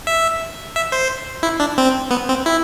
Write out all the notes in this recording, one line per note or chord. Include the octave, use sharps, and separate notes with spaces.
E5
E5
C5
E4
D4
C4
B3
C4
E4